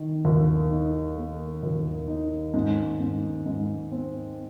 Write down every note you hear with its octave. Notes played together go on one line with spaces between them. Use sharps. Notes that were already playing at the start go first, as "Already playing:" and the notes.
Already playing: D#3
D#2
D#4
A#3
D#2
D#4
G#2
G#2
G#2
C4